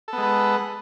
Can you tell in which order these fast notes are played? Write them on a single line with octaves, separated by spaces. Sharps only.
A4 B3 G#3 B4